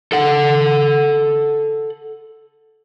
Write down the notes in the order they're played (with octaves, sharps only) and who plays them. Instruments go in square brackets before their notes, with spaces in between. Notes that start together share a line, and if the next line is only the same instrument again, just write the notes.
[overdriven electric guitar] A4 F#5